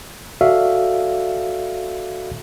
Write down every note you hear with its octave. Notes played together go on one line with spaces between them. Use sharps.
F#4 A4 D5 E5 F5